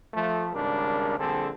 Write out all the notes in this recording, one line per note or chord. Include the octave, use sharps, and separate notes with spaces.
F3 A3
G#1 G#2 C#3 G3 D4 A#4
A#1 D3 G3 C4 G#4 A4